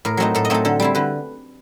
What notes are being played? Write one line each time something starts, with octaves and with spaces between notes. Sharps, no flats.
A2 A#4
F#3 A3 C4 D#4
A2 A4
D#5
F#3 A3 C4 D#4 A4
D3 A4
G3 C4 E4
D3 B4